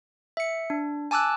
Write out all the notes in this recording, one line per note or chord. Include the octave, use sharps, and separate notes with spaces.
E5 C#7
D4
G#5 A5 D6 E6 F#6